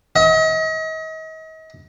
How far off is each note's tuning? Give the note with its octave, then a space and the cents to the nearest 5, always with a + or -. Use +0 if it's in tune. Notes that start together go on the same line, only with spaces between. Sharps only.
D#5 +40